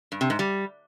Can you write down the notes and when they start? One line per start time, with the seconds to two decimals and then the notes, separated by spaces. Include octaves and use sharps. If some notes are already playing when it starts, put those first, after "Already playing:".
0.12 G2
0.21 C3
0.30 G#2
0.39 G3